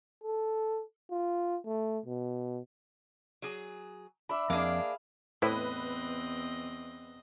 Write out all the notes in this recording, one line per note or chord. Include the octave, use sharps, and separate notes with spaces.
A4
F4
A3
B2
F#3 G#4
D4 E5 B5
F2 A#3 D4 G#4 F5
E2 A2 C4 E4 B4 D#5